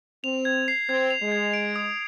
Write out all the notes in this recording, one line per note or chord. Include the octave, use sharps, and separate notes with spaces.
C4 F7
G#6
C7
C4 G#6
F7
G#3
G#6
D7
D#6